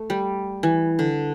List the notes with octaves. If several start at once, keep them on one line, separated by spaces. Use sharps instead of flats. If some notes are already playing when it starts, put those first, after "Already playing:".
Already playing: A3
G3
E3
D3